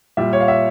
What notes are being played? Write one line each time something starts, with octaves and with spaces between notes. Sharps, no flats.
A#2 G3 E5
C#5
F5
E5